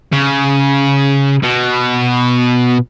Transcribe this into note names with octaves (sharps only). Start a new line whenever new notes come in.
C#3
B2